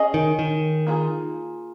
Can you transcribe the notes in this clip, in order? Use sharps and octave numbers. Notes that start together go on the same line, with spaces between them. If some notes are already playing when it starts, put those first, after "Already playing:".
Already playing: C#4 G#4 D#5
D#3
D#3
A#3 F4 G#4